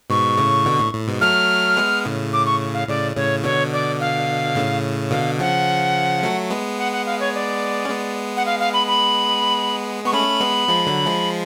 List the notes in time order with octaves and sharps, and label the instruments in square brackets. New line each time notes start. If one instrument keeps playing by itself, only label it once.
[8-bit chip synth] G#2 B2 [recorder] C#6
[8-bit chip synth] A2 C#3
B2 D3
A2
A2
G#2 B2
[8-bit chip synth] F#3 A3 [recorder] F6
[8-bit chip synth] G#3 B3
A2 C#3
[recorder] D6
C#6
F5
[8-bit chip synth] A2 C#3 [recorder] D5
[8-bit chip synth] A2 C#3 [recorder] C#5
[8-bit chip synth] B2 D3 [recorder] C#5
[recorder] D5
F5
[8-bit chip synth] A2 C#3
[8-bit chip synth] B2 D3 [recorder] F5
[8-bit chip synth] C#3 F3 [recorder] F#5
[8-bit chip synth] F#3 A3
G#3 B3
[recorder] F#5
F#5
F5
C#5
D5
[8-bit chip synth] C#4
G#3 B3
[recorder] F#5
F5
F5
B5
B5
[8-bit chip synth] B3 [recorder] C#6
[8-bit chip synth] A3 C#4 [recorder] B5
[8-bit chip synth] G#3 B3
F3 G#3
D3 F#3
F3 G#3